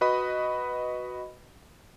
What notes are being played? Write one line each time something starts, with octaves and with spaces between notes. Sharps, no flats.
F#4 B4 D#5 B5